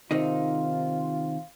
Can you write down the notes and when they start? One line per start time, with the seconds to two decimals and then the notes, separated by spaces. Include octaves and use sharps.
0.11 C3 D#3 C4 D#4 F4